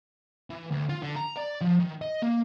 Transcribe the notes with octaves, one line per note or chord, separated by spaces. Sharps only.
E3
D2
F4
D3
A#5
D5
F3
D#3
D#5
A#3